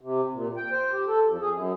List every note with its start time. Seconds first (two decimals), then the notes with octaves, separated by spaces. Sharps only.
0.01 C3
0.33 A#2
0.57 G5
0.72 C5
0.92 G4
1.08 A4
1.26 F2
1.42 G#4
1.54 F#2